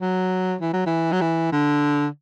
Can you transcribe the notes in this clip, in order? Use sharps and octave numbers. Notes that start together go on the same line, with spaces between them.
F#3
E3
F#3
E3
F#3
E3
D3